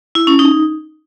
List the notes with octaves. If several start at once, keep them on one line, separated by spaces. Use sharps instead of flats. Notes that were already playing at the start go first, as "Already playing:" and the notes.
E4
C#4
D#4